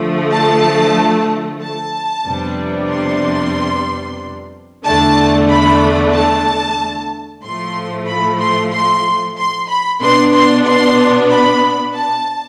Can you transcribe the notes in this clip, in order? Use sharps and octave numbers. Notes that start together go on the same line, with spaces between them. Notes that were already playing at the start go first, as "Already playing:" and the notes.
Already playing: D3 F3 A3
A5
A5
F2 C3 G3 B3 D4
C6
E2 D3 A3 D4 A5
B5
A5
A2 F3 A3 C6
B5
C6
C6
C6
B5
B2 B3 D4 C6
C6
C6
B5
A5